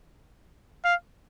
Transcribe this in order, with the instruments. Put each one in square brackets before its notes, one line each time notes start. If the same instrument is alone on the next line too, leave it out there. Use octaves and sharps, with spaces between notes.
[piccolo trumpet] F5